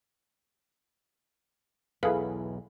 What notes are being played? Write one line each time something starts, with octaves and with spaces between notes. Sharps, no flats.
B1 E2 E4 G#4 A4 B4 F5